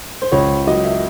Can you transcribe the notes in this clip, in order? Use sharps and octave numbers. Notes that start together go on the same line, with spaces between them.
C5
C#2 C#5
F#3 D#5
E5